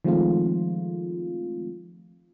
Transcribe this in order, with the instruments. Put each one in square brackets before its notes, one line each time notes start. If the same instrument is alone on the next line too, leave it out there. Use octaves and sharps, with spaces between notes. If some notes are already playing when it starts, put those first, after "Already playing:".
[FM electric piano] D#3 F3 G#3 A3 C4 F4